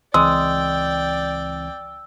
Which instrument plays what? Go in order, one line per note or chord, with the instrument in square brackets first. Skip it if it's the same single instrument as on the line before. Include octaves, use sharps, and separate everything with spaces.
[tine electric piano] C#2 E3 C4 [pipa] G#3 [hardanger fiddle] D5 G5 [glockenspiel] E6